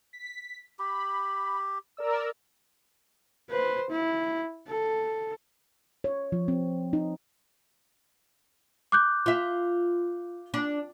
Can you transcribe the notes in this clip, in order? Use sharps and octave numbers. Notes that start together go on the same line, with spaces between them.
B6
G4 B5
A#4 D5 E6
B4 C5
E4
A4
C#5
F3
C4
D#4
D6 F#6 G6
F4 E5
D4